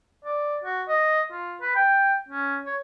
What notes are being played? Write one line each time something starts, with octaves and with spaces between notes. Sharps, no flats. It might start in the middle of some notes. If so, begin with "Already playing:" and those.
D5
F#4
D#5
F4
B4
G5
C#4
C#5